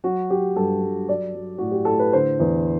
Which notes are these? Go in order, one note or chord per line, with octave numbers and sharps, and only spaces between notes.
F#3 F#4
F#3 G4
G2 A4
G2
F#3 D5
F#3
A2 F#4
G4
A2 A4
B4
D3 C5
E2